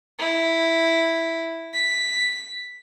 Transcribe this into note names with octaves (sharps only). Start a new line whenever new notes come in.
E4
B6